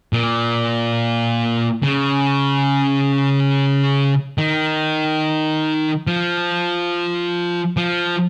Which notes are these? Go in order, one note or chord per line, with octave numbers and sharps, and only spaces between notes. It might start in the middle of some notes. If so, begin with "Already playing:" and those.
A#2
C#3
D#3
F3
F3